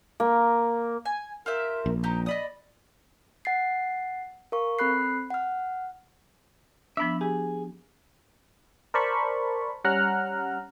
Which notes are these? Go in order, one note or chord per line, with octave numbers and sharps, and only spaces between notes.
A#3
G#5
F4 G4 A#4 E5
A#1
D#4 G4 A#5
D5 D#5 B5 D#6
F#5 A6 C7
A#4 F5 C#6
C4 A4 B5 F#6 C7
F#5 F6
F3 B3 D4 E5 B5
G4 G#4
A#4 C5 D5 A5 B5 C#6
G3 C#4 F#5 A#5 F6 F#6